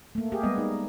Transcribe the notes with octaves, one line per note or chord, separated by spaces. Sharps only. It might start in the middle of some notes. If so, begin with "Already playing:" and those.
A3 A#3
G4 G#4 A#4
G3 G#3 B3 D#5
D#4